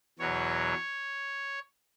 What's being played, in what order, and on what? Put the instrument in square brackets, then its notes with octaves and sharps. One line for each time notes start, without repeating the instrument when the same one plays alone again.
[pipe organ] E2 B2 F#3 C#5